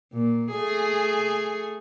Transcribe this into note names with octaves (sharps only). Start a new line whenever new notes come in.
A#2
A3 G#4